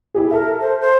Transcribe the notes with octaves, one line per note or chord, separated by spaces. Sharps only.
E4 G4 G#4
A4 A#4 E5
C5
C5